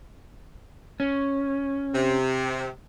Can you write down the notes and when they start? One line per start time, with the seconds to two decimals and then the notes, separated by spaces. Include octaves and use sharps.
1.00 C#4
1.94 C3